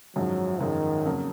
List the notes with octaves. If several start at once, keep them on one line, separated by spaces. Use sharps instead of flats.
G#1 F#2 F3 F#3 G#3
G#1 F#2 D#3 F3 G#3
F2 C#3 F#3 A#3